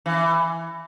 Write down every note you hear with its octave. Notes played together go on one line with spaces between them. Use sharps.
E3